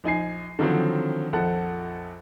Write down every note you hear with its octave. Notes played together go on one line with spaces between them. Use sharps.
A#1 D#4 G#5 C7
D3 D#3 F3 F#3 C4
A#1 F2 A4 F#5